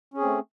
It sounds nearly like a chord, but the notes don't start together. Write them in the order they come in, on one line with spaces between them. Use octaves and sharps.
C#4 G#4 C4 A3